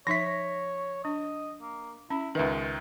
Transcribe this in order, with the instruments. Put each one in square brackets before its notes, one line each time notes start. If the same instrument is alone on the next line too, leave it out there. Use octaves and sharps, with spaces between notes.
[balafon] F3 D#4 E5 [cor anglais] C#5 [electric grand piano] A#6 B6
[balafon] D4 [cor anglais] D#5
[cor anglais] A#3
[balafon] C#4 B5 [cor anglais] E4
[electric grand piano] C#2 D#3 [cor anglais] G#3 [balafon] B4 E5